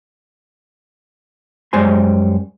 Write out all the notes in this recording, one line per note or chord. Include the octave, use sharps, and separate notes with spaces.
F#2 G3 G#3 C5 G#5 C6